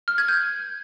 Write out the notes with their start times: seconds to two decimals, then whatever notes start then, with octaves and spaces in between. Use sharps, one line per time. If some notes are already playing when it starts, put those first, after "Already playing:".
0.08 F6
0.18 G#6
0.28 G6